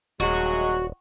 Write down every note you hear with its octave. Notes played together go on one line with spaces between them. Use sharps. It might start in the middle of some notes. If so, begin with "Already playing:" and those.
D#1 F#3 G#3 F#4